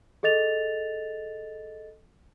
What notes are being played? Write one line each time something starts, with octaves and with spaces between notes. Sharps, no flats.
G#4 A4 D#5 A6 F7